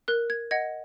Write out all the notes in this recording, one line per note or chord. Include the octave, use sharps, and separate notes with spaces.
A#4 F#6
G#6
D#5 F#5 G#6